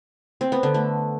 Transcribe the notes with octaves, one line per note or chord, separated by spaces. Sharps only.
C4
B3
D3
A3